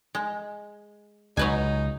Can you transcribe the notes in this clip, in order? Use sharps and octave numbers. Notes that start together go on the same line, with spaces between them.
G#3
C#2 F#3 D#4 B4 G#5